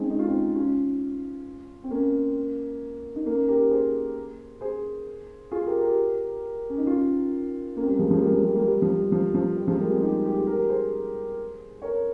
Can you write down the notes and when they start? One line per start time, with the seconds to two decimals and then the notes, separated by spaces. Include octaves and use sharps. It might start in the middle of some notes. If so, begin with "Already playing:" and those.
Already playing: G#3 C4 C#4 D#4
0.10 D#4
0.19 F4
0.28 C4 D#4
0.55 C#4 F4
1.84 C4
1.91 A#3 C#4
3.16 D#4
3.26 A#3 C#4
3.48 G4 A#4
3.71 G#4 C5
4.61 G#4 C5
5.51 F4 G#4
5.66 G4 A#4
5.81 G4 A#4
6.70 C#4
6.78 D#4
6.87 C#4 F4
7.76 A#3 C#4
7.83 C4
7.88 G3 A#3
7.99 F3 G#3
8.11 F3 G#3
8.21 G3 A#3
8.33 F3 G#3
8.45 G3
8.55 G3 A#3
8.67 G3
8.82 F3
8.97 G3
9.12 F3
9.34 F3
9.57 G3
9.68 F3 G#3
9.79 G3 A#3
9.90 G#3 C4
10.02 D#4 G4
10.25 G4
10.36 G#4
10.47 G4 A#4
10.69 G#4 C5
11.82 A#4 C#5